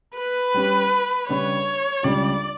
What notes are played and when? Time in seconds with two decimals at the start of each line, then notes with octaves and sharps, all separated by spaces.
0.18 B4
0.54 G3 C#4 G4
1.29 C#3 G3 D4 C#5
2.03 C#2 C#3 G3 D4 D5